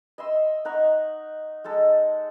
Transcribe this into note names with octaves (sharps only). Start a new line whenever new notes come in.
D#5 E5 C6
D#4 F#5 A#5 C#6
G#3 D#4 A4